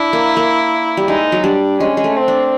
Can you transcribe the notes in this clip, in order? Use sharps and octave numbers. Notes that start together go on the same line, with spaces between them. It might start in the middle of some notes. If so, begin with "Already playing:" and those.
Already playing: D4 E4
A#3
A#3
G3
G#3 D#4
F#3
G3 D4
G#3 C#4
G#3
A3
C4
D4